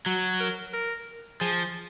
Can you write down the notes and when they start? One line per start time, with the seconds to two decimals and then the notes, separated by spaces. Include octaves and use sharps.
0.06 F#3 F#4
0.40 A#4
0.74 A#4
1.41 F3 G#4